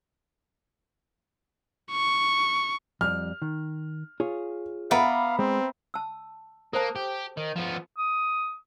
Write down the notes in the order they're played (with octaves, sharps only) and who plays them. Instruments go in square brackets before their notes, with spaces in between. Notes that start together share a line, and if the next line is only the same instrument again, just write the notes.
[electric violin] C#6
[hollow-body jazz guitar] F2 G3 [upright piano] F6
[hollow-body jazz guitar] D#3
F4 G#4 C#5
[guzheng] B3 D5 [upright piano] E5 A#5 B5 [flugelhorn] F5
[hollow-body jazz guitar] G#3 [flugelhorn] C4
[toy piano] A5 E6
[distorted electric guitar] A#3 [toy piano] A4 C5 A5
[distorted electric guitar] G4
D#3
F3 B3
[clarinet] D#6